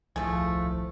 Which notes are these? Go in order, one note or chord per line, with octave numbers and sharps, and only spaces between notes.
D#1 C2 A2 F3 A3 G#4